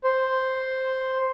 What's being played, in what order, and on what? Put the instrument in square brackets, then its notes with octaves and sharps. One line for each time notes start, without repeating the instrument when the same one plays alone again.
[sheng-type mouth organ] C5